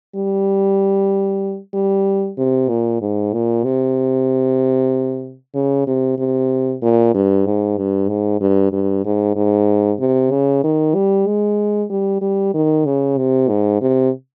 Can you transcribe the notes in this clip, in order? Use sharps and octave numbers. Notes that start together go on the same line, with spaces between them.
G3
G3
C3
A#2
G#2
A#2
C3
C#3
C3
C3
A#2
G2
G#2
G2
G#2
G2
G2
G#2
G#2
C3
C#3
D#3
G3
G#3
G3
G3
D#3
C#3
C3
G#2
C3